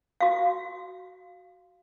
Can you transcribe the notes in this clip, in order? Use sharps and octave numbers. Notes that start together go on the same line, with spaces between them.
F#4 F5